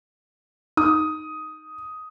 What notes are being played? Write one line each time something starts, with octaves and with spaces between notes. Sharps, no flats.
D#4 D#6